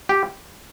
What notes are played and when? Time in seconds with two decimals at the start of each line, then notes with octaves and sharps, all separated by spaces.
0.09 G4